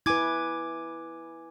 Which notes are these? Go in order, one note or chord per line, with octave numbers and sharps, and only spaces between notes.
E4 B4 G#5 D6 G#6